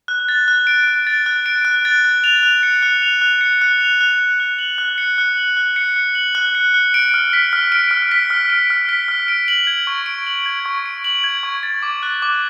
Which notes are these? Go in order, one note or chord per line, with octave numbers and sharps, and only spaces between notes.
F#6
A6
F#6
D7
F#6
A6
F#6
D7
F#6
A6
F#6
F7
F#6
C#7
F#6
F7
F#6
C#7
F#6
F7
F#6
C#7
F#6
F#7
F#6
C#7
F#6
F#7
F#6
C#7
F#6
F#7
F#6
C#7
F#6
D7
F6
B6
F6
D7
F6
B6
F6
D7
F6
B6
F6
D7
F#7
G#6
C#6
D7
F#7
G#6
C#6
D7
F#7
G#6
C#6
A6
D6
F#6
D6